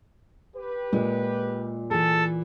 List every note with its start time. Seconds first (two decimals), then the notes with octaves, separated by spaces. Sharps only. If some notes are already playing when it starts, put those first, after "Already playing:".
0.56 G4 B4
0.93 A#2 G#3
1.91 E3 G#4 A4